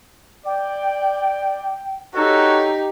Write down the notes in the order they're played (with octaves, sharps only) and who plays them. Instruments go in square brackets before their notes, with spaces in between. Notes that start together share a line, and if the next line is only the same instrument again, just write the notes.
[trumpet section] D5 [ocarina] G5
[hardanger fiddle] D#4 G4 [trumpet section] F#4 A4 C#5